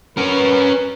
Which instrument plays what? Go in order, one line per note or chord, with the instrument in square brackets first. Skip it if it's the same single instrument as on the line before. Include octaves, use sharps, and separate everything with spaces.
[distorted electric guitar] C#4 A#4 [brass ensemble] B4